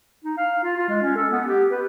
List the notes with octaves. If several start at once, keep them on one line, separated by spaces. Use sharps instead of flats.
D#4
F5
F4
F4
G#3
C#4
A4
B3
G4
B4